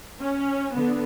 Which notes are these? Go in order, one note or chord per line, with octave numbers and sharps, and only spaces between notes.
C#4
D3 B3